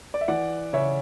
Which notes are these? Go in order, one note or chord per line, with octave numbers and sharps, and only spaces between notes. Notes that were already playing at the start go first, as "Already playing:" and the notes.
D5
E5
E3 D5 F#5
C#3 C#5 E5